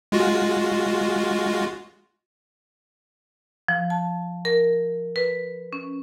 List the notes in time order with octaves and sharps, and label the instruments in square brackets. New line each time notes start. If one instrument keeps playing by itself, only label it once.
[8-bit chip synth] G#3 F4 F#4
[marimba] F3
A5
A#4
B4
C#4